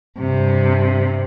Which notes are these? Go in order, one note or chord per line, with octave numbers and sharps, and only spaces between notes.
G2 C3